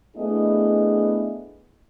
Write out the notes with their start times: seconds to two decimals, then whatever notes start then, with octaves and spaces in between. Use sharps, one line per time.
0.17 A3 B3 D4 E4 G#4 D#5